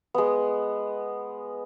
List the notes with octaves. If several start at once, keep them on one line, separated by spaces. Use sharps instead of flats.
G#3 B3